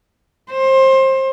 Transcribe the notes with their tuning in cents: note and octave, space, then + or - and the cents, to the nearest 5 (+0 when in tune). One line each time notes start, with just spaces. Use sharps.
C5 +25